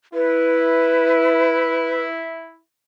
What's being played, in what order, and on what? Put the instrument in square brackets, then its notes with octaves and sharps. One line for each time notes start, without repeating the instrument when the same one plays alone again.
[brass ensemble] E4 [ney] B4